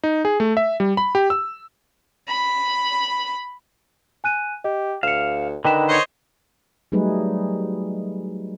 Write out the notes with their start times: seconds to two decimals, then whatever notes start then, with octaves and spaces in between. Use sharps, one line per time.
0.04 D#4
0.25 G#4
0.40 A3
0.57 E5
0.80 G3
0.97 B5
1.15 G4
1.30 E6
2.28 B5
4.24 G#5 F#6 D#7
4.64 G4 D#5
5.03 D2 F5 C#7 E7
5.65 D3 D#3 D#4 B4 G5 E7
5.89 C5 C#5 D#5
6.92 F#3 G3 A3 D#4 G#4 B4